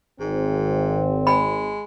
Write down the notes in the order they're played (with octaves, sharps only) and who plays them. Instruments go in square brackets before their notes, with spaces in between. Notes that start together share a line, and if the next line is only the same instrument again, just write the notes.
[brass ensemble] G#1 [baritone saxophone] G#2 [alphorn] C4
[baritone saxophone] G#3 [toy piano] B5